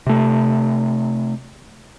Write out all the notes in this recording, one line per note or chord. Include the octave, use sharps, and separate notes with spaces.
C3 A3